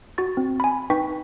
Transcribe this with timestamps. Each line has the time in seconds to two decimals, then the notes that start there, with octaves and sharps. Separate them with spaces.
0.18 F#4 C#6 A6
0.37 C4
0.60 G#5 B5
0.90 D#4 B4 G5 C#6 B6